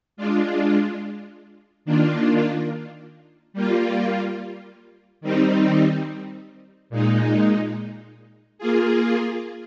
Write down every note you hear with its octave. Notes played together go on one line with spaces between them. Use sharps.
G#3 D4 F4
D#3 A#3 D4 F4
G3 A#3 F4
D#3 G3 C4 D#4
A#2 G#3 D#4
A#3 F4 G#4